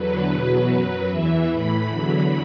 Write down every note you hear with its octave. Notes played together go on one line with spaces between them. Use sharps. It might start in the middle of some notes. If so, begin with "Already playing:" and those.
Already playing: E2 D3 F#3 B4
E2 B2 F#3
F#2 F#3 B4
E2 E3 E5
A2 E3 B5
E2 D3 F#3